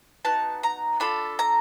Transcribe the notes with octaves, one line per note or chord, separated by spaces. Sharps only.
B3 D#4 F#4 A5
A#5
D4 F4 A4 B5
A#5